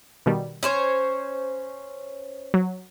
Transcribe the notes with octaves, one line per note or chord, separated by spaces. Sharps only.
B2 D#3 G3
C#4 C5 C#5
F#3